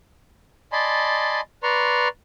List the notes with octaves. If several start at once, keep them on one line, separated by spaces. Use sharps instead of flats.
D5 D#5 G#5 A5 B5 C6
B4 D5 A#5 C6 C#6